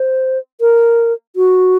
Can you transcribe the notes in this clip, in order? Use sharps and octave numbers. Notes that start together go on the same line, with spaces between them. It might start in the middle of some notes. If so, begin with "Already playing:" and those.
Already playing: C5
A#4
F#4